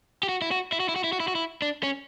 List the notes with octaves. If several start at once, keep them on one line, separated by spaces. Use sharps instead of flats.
G4
F#4
E4
F#4
E4
F#4
E4
F#4
E4
F#4
E4
F#4
E4
D4
C#4